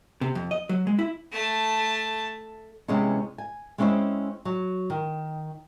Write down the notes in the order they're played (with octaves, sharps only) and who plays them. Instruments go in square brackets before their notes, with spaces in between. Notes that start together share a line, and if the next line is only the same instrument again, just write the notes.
[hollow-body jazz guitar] C3
F2
D#5
F#3
G#3
E4
[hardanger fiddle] A3 A5
[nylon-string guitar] C3 E3 G3 G#3 B3 C#4
G#5
G#3 C4 C#4 E4 C5 D#5
F#3
D#3